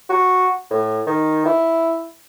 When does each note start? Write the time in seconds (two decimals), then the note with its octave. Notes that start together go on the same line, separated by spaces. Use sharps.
0.10 F#4
0.71 A2
1.07 D#3
1.46 E4